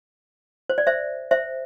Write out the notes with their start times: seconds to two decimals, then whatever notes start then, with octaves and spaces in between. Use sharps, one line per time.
0.69 C5
0.78 D5
0.87 C5 E5
1.31 C5 E5